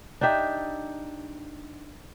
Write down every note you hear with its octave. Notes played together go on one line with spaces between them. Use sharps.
D4 D#4 G4 E5